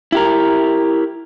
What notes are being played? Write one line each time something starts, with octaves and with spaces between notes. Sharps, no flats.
E4 G4 A#4